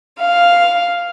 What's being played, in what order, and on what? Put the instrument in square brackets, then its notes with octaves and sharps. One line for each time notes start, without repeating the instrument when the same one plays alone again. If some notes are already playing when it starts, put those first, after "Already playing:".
[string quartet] F5